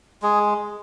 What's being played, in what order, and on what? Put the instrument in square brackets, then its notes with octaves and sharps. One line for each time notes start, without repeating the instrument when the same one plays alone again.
[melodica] G#3 G#4